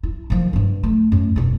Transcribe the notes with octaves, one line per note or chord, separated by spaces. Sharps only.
E4
D#3 F3
G2 B3
A3
F#2 A3
E1 D4